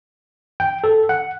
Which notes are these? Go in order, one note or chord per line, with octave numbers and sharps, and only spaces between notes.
G5
A4
F#5